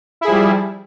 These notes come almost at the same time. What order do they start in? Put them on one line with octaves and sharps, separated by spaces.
E4 G#4 F3 G3